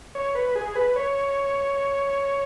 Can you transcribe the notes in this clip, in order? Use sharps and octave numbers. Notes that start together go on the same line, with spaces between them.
C#5
B4
G#4
B4
C#5